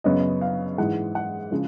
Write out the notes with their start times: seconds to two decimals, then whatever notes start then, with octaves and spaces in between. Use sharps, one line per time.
0.04 F#2 C#3 F#3 B3 D#5
0.41 F5
0.78 G#2 E3 G#3 F#5
1.15 F#5
1.51 C#3 F3 G#3